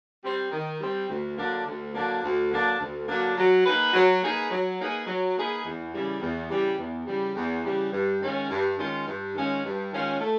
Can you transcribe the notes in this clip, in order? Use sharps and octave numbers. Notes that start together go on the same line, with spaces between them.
G3 C4
D#3
G3 C4
D2
D3 F#3 A#3 D4
D2
D3 F#3 A#3 D4
D2
D3 F#3 A#3 D4
D2
D3 F#3 A#3 D4
F#3
A#3 D#4 G#4 B4
F#3
A#3 D#4 G#4 B4
F#3
A#3 D#4 G#4 B4
F#3
A#3 D#4 G#4 B4
E2
C#3 E3 G3
E2
C#3 E3 G3
E2
C#3 E3 G3
E2
C#3 E3 G3
G2
D#3 G#3 C#4 F4
G2
D#3 G#3 C#4 F4
G2
D#3 G#3 C#4 F4
G2
D#3 G#3 C#4 F4
A3